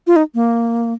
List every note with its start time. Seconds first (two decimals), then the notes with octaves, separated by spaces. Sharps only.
0.07 F4
0.16 D#4
0.34 A#3